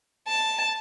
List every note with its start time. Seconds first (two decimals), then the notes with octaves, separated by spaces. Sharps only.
0.28 A5